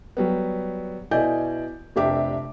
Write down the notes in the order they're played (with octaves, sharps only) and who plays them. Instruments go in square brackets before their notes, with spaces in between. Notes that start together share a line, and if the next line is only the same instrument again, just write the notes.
[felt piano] F#3 G3 B3
B2 E4 D5 D#5 G#5 G6
F1 C3 D4 G4 E5 D6